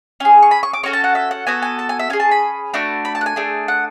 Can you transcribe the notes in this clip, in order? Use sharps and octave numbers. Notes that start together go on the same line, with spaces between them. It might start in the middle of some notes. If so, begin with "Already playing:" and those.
C#4 G#4 G#5
C#6
B5
C#6
D6
C#4 F#4 A4 C#6
A5
F#5
E5
F#5
B3 F#4 A4 G#5
G#5
A5
G#5
E5
C#4 G#4 G#5
A5
B5
A3 D4 F#4
B5
A5
F#5
G#5
A3 D4 G#4
F#5